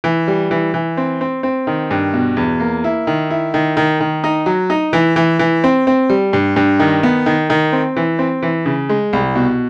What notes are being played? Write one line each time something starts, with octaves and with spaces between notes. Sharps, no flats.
E3
G3
E3
E3
C4
C4
C4
D#3
G2
B2
E2
A#3
E4
D#3
E4
D#3
D#3
D#3
D#4
F#3
D#4
E3
E3
E3
C4
C4
G3
G2
G2
D#3
B3
D#3
D#3
C4
E3
C4
E3
C#3
G#3
C2
B2